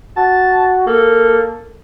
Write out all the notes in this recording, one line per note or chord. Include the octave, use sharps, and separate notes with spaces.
F#4 A5
A#3 A4